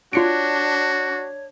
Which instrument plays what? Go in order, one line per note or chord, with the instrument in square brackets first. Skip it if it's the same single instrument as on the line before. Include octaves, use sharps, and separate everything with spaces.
[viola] D4 [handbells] F4 C#7 D7 [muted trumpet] F#4 [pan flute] C#5